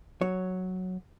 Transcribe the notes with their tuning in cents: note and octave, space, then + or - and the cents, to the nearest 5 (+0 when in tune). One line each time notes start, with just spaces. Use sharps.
F#3 +0 C#5 +0